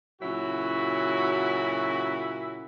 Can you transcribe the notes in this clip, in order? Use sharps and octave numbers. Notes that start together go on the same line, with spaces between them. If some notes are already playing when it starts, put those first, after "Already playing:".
A#2 C#3 F#3 E4 F#4